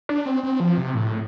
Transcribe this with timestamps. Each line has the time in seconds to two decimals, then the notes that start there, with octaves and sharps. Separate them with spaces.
0.09 D4
0.26 C4
0.43 C4
0.60 F3
0.78 C3
0.95 A2